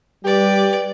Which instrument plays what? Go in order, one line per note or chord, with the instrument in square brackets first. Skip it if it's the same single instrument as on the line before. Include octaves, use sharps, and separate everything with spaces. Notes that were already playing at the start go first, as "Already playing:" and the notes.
[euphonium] G3 [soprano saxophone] G4 [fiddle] B4 D5